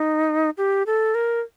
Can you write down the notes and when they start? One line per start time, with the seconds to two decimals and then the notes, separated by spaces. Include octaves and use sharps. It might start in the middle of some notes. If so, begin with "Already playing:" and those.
Already playing: D#4
0.57 G4
0.86 A4
1.15 A#4